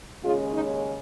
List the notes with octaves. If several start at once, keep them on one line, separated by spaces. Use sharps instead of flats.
D#2 C#3 G#3 C#4 F4 G#4
D#4